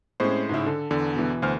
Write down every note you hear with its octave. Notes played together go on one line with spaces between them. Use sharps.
A2 G#3 C4 C#4 C5
G#2 C#3 E4
D3 A4
E2 D3
B2 E3
D2 C5 F6